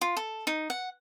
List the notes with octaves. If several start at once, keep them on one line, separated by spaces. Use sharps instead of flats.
F4
A4
D#4
F#5